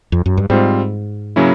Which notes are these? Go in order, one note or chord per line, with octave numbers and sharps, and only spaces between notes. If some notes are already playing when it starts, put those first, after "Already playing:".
F2
F#2
G2
G#2 G3 C4 F4
C#3 F#3 A#3 C#4 E4